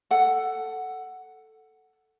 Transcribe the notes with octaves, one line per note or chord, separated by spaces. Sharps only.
A4 F#5